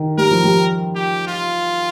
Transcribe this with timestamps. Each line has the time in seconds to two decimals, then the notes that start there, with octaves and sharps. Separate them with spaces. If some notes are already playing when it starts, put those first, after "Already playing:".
Already playing: D#3
0.18 G3 A#4
0.31 F3
0.44 G3
0.96 G4
1.27 F4